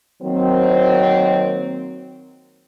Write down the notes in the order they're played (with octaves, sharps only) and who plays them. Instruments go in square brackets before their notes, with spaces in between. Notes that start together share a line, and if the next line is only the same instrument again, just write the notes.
[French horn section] D#3 F#3 A#3 C4